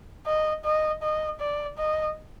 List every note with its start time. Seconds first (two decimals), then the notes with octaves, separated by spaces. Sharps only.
0.26 D#5
0.64 D#5
1.02 D#5
1.40 D5
1.78 D#5